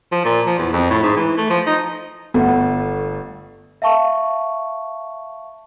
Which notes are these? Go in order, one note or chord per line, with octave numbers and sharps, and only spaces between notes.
F3
A#2
F3
E2
F2
A2
G#2
E3
A3
F3
D#4
G1 A3 B3
E5 F5 A5 C#6